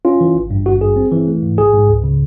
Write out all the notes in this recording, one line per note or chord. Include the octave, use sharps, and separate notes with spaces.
C#4 F4
E3
G#1
G2
G#1 F#4
G2 G#4
C4
E3
A3
G#2
A#1 G#4
G#2
C#2
C#3